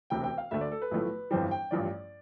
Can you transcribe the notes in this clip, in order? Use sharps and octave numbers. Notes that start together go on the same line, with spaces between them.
E1 D2 C3 G5
G5
F5
D2 D3 A3 E5
D5
A4
B4
B1 A2 F3 A3
G1 F2 E3 G3 C5
G5
A1 G2 F3 D5